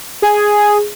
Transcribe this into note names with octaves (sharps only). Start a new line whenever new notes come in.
G#4